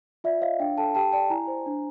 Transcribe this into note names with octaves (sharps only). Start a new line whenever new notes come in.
F4 D5 E5
C#5 D#5 F5
D4 F5 G5
A4 G5 A5
G4 G5 A5
D5 G5 A5
E4 G#5 A#5
C5
D4